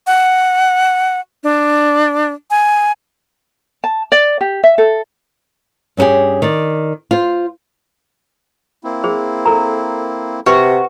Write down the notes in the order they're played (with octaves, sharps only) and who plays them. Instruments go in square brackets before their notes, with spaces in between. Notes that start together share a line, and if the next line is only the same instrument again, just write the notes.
[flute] F#5
D4
G#5
[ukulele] A5
D5
G4
E5
A4
[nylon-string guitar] G2 C#4 D4 G4 G#4
D#3 D5
F4 C5
[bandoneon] A#3 C4 E4
[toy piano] G#4 C5
A4 A#4 A#5
[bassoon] C3 [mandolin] F#4 [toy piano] B4